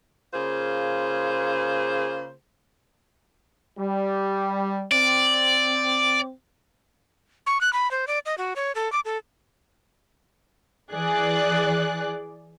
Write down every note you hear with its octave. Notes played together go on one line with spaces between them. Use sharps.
C#3 A#3 F4 G#4 C5
G3
C4 D5
C#6
F#6
B5
C5
D5
D#5
F#4
C#5
A4
D6
A4
E3 G#4 D5 F#6